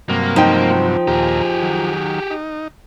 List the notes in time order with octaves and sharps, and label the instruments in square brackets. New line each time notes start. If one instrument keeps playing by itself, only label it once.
[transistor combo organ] G2 C3 F#3 [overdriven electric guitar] A#3
[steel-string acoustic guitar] F3 [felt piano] D#4 G5
[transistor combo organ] D#2 A#2 A#5 [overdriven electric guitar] G4 G#4
[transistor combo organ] D#3 F#3
D#4